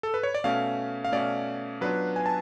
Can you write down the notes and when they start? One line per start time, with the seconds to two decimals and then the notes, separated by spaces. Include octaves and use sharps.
0.03 A4
0.14 B4
0.23 C#5
0.34 D5
0.44 B2 A3 C#4 F5
1.05 F5
1.12 B2 A3 C#4 D5
1.81 F#3 B3 D4 F4 B4
2.16 G#5
2.26 A5